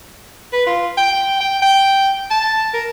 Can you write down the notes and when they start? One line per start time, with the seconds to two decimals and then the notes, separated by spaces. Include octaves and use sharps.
0.53 B4
0.67 F4
0.98 G5
1.41 G5
1.62 G5
2.31 A5
2.74 A#4